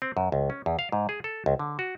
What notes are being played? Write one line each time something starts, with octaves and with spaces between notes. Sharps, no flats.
C4
F#2
C#2
C#4
E2
F5
G#2
G#4
A4
C#2
D3
F#4